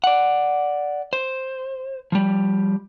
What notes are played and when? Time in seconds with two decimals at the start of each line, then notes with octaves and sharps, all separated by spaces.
0.04 D5 F#5
1.13 C5
2.12 F3 G3